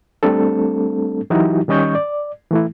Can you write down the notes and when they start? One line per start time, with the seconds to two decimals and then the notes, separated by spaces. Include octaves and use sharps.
0.23 G3 A3 C4 D4 A4
1.30 E3 F#3 D#4 E4 F#4 G4
1.68 D#3 G3 C#4 D#5 C#6 G6
1.95 D5
2.51 E3 A3 E4